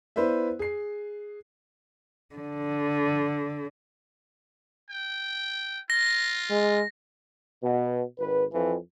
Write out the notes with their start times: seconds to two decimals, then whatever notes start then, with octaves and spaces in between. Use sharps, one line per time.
0.16 B3 E4 B4 C5 D5 E5
0.59 G#4 C7
2.35 D3
4.90 G5
5.90 F4 A#6
6.51 G#3
7.62 B2
8.18 G#1 B4
8.53 F2 E3